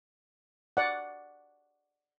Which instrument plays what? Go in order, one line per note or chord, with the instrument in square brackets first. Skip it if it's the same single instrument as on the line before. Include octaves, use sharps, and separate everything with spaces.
[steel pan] D5 F#5